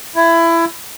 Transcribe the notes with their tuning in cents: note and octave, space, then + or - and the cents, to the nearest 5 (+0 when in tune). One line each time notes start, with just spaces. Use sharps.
E4 +20